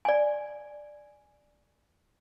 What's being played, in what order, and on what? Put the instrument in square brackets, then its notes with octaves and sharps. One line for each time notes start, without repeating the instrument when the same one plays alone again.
[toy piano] D5 G#5